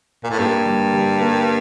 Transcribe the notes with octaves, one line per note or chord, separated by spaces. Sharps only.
A#2
A2
G2 A#3
G3
G3
A#3